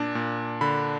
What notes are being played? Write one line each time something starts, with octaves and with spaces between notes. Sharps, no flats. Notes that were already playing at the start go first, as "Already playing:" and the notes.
Already playing: A#2 D4
A#2
D3 B5